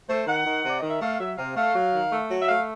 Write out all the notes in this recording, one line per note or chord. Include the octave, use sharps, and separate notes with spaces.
A3 C5
D#3 F#5
D#3
C3 D5
D#3 D#5
E5
A3 F5
F#3 E5
C3 F5
A3 F5
F#3
D#3
A3
F#3
E5
A3 F5